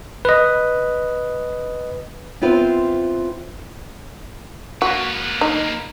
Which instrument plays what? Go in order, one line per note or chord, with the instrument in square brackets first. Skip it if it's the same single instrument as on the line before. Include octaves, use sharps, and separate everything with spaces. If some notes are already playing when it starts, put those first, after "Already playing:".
[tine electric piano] B4 D#5
[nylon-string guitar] B3 C4 E4 F4 B4 C5
[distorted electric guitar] A#3 B4 [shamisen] F#4
[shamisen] D#4